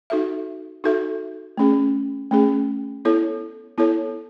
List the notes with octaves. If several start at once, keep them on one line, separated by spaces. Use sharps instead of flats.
D#4 F#4 A4 E5
D#4 F#4 A4 E5
A3 C#4 G#4
A3 C#4 G#4
B3 E4 A4 C#5
B3 E4 A4 C#5